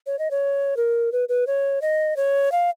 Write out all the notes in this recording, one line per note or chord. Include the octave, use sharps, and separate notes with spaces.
C#5
D#5
C#5
A#4
B4
B4
C#5
D#5
C#5
F5